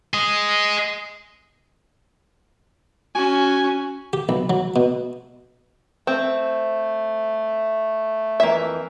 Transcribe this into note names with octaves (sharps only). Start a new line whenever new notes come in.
G#4 D#5
C#4 F#4 G#5
G4
B1
F#3
B2
A3 C4
F2 E3 A#3 E5